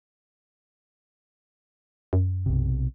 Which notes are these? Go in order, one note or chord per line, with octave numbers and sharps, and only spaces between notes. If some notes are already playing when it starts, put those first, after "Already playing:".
F#2
B1 C3